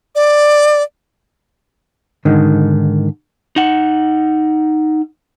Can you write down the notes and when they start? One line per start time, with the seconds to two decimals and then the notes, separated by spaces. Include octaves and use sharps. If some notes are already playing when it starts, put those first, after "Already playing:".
0.15 D5
2.25 G#2 D3 D#3
3.56 D#4 F#5